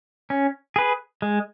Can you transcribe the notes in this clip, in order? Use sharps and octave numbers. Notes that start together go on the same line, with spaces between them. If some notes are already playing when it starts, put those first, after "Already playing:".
C#4
G#4 B4
G#3